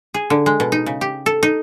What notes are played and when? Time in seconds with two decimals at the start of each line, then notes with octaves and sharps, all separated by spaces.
0.14 G#4
0.30 D3
0.46 G#3
0.60 B2
0.72 D#4
0.86 C#3
1.01 G4
1.26 A4
1.43 D#4